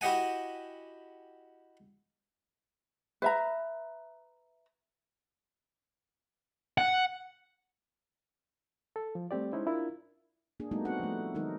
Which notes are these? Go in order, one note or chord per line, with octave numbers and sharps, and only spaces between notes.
E4 F#4 G4 D#5 F#5 G#5
B4 E5 A#5
F#5
A4
F3
G3 A3 C4 G4 D5
G#3 C#4 D#4 E4 C5
D4 E4 F4 A#4
A#3 D4 G#4
G3 A3 B3 D#4 F#4
C4 D#4 F#4 F#5
F3 A3
D#3 F#3 G#3 D#4 A#4